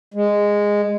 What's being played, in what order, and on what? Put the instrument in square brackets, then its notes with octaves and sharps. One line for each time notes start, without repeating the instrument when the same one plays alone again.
[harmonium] G#3